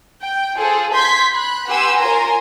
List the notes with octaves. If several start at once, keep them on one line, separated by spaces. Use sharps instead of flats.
G5
F4 G#4 A4 C5
C6 G6 G#6 B6
B5 F#6
G4 B4 F#5 G#5 C6 E6
F4 A#4 C#5 G#5 A#5 C6